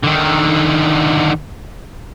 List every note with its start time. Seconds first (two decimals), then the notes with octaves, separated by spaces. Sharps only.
0.03 D3 D#3